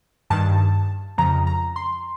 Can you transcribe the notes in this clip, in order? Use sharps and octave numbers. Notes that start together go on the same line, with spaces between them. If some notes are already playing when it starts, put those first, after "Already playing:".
G2 D#3 A5
F2 C#3 F3 A#5
A#5
C6